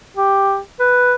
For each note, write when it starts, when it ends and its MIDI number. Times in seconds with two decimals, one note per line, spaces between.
0.17 0.59 67
0.80 1.15 71